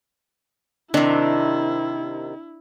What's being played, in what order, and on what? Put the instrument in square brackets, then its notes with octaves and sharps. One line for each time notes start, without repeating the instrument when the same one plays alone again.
[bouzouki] C3 D#3 [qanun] D4 [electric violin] E4